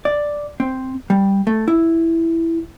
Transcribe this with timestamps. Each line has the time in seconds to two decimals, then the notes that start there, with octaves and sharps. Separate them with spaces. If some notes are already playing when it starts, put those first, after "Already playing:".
0.05 D5
0.60 C4
1.10 G3
1.47 A3
1.68 E4